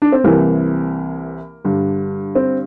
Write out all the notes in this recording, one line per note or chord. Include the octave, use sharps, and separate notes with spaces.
D4
C4
C2 C3 E3 A#3
G2 D3
C4